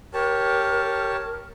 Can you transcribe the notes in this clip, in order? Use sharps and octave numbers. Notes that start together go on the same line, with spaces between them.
G4 A#4 C#5 A5